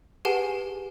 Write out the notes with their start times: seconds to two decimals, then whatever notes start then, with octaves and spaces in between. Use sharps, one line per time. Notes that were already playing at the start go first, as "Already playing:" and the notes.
0.25 G4 G#4 B4 F#5 G#5 A5